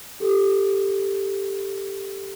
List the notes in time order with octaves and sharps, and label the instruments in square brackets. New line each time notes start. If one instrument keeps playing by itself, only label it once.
[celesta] G4 A4